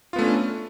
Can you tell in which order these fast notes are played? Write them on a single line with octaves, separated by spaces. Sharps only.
F4 B3 A3 C#4 D4